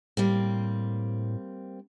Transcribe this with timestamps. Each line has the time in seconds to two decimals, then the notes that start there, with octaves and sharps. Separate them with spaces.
0.17 A2 G3 A#3 C4